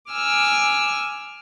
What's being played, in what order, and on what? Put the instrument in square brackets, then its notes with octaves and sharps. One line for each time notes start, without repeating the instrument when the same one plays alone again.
[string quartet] G#5 D6 E6 F6